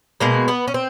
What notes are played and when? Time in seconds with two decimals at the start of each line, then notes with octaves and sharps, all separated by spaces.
0.20 B2 G#3 A#3
0.48 B3
0.68 C#4
0.74 C4